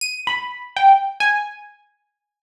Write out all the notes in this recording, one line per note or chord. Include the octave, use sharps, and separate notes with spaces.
D#7
B5
G5
G#5